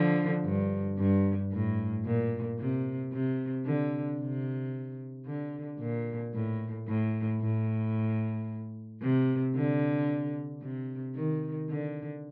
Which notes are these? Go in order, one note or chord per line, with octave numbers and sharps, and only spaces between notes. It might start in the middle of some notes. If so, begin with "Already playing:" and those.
Already playing: D3 F3
G2
G2
A2
A#2
C3
C3
D3
C3
D3
A#2
A2
A2
A2
C3
D3
C3
D#3
D3